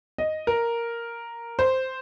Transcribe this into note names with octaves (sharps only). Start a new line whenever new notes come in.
D#5
A#4
C5